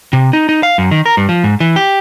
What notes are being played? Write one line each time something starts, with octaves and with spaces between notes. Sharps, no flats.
C3
D#4
D#4
F5
F#2
D#3
A#4
G2
F3
G#2
E3
G4